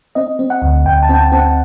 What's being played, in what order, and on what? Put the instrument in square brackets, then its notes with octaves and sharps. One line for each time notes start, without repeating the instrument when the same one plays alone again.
[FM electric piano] C4 D#5
C4
F#5
D2
D2 G5
A5
C4 G5
A5
C4
F#5